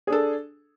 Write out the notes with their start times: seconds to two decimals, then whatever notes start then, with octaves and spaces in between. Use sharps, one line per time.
0.07 G#4
0.10 D4
0.12 A4